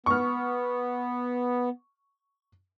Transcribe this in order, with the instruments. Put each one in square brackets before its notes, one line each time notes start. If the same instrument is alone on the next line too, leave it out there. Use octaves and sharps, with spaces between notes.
[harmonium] B3 [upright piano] C#6 F6